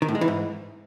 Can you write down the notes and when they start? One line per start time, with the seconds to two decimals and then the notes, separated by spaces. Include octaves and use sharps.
0.02 D#3
0.08 A2
0.15 G#3
0.21 E3
0.28 G#2